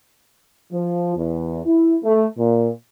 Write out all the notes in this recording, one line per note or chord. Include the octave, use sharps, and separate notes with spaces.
F3
E2
E4
A3
A#2